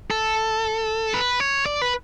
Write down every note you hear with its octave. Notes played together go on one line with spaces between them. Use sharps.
A4
B4
C#5
D5
B4